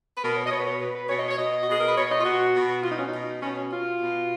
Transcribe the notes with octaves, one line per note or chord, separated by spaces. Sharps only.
B4
B2 A#4
C#5
D#5
B2 C#5
B4
C#5
B2 B4
B4
B2 C#5
D#5
C#5
B2 D#5
F#4
B2 G#4
A#4
B4
B2 C#5
D#5
F4
B2 F#4
B2
B2 F4
D#4
C#4
D#4
B2
B2 C#4
C#4
B2 F4
B2